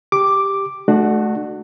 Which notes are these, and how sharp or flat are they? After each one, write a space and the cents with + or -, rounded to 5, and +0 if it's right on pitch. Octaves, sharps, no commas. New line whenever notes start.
G4 +5 D6 +0
A3 -25 D4 +25 F#4 +0